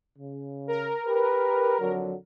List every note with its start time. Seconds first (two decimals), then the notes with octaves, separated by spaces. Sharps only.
0.19 C#3
0.68 A#4
1.07 G4 B4
1.80 F2 D3 F#3